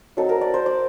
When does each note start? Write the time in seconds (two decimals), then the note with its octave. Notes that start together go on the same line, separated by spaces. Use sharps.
0.17 F#3 C4 D#4 A4
0.29 A#4
0.41 D5
0.54 C5
0.66 D5